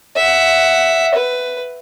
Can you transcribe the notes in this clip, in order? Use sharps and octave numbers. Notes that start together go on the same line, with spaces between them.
E5 F#5
B4